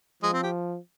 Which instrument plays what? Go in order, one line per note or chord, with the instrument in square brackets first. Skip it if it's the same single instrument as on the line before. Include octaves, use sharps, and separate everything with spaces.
[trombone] F3 [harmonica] G#3
[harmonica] C4
G4